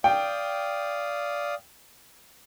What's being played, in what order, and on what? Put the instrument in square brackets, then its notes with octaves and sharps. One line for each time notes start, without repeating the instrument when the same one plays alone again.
[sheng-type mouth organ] D5 F5 D#6 [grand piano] G5